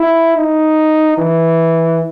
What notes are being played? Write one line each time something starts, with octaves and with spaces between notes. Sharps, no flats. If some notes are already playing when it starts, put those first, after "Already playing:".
Already playing: E4
D#4
E3